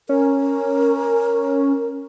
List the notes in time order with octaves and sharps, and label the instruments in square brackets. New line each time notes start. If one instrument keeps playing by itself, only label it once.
[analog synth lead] C#4 [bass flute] A#4